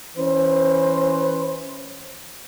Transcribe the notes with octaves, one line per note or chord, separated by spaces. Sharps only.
E3 C#4 B4 C5